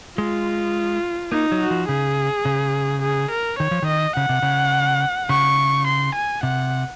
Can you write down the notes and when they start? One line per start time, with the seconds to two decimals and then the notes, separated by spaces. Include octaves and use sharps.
0.18 G#3 F4
1.32 A#3 D#4
1.52 F#3
1.60 F#4
1.71 F3
1.89 C#3 G#4
2.45 C#3
3.02 G#4
3.31 A#4
3.59 D#3 C#5
3.71 F3
3.82 D#3 D#5
4.16 C#3 F#5
4.29 C3
4.42 C#3
5.29 C#3 C#6
5.87 C6
6.15 G#5
6.43 C3 F#5